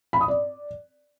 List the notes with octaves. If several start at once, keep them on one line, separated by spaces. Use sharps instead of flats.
B5
D#6
D5